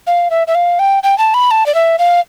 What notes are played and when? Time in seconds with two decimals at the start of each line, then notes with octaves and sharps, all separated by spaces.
0.07 F5
0.30 E5
0.47 E5
0.55 F5
0.79 G5
1.03 G5
1.18 A5
1.34 B5
1.51 A5
1.66 D5
1.75 E5
1.99 F5